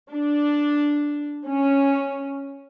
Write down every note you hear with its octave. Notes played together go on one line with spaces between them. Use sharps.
D4
C#4